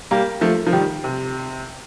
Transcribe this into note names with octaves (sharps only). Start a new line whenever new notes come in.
G3 A#3
F3 A3
F3
D#3 G3
C3